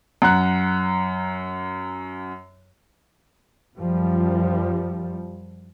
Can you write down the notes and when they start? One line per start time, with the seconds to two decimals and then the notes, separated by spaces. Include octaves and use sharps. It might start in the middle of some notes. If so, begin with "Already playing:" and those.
0.22 F#2 F#5 A#5 F#6
3.77 F#2 F3 G3